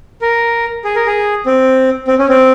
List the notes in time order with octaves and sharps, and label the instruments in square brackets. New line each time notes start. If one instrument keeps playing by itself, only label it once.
[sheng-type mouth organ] A#4
G#4
A#4
G#4
C4
C4
C#4
C4